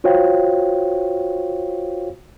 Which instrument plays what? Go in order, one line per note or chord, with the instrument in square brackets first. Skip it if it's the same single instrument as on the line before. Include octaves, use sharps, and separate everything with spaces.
[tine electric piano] F4 F#4 C5 C#5 F5 G5